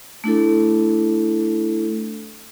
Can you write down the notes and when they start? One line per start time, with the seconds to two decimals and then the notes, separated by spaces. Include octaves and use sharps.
0.24 A3 D4 E4 A4